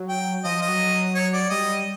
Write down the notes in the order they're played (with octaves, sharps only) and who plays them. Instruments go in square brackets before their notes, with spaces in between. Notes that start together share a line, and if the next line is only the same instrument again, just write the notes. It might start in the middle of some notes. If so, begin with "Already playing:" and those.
Already playing: [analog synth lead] F#3
[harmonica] G5
[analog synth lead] F3 [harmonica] D#5
[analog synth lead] F3
[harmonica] D#5
[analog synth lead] F#3
[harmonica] C#5
D5
[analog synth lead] G3 [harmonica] D#5